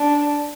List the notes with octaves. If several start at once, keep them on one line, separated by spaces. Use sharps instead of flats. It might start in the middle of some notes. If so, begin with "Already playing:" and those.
Already playing: D4